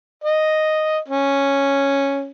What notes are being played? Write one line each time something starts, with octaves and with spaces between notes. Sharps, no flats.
D#5
C#4